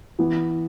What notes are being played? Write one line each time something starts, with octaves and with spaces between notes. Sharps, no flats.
E3 B3